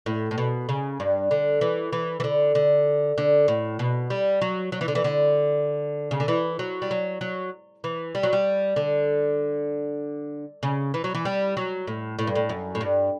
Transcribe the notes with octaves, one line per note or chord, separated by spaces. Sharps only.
A2
A2
B2
C#3
G2
D3
E3
E3
E3
D3
D3
D3
A2
B2
G3
F#3
F#3
E3
D3
E3
D3
C#3
D3
E3
F#3
G3
F#3
F#3
E3
G3
F#3
G3
D3
C#3
E3
F#3
E3
G3
F#3
A2
A2
G2
A2
F#2
A2
G2